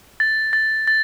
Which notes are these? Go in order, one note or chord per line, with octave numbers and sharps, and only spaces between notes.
A6
A6
A6